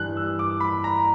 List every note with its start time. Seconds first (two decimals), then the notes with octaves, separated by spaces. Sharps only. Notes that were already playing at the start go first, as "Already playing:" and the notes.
Already playing: G2 E3 G3 F#6
0.17 E6
0.39 D6
0.60 B5
0.84 A#5